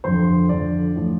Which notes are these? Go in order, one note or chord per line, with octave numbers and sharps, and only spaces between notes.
F2 D3 F3 C5
F2 D3 F3 D5
A2 F3